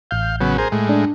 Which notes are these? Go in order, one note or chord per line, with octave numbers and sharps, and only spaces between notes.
A1 F5 G6
C#3 F#3 B3
G#4 A#4 C5
A2 G#3
D4